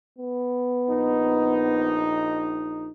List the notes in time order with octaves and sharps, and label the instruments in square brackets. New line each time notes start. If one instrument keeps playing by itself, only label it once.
[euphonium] B3
[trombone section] A#1 D#4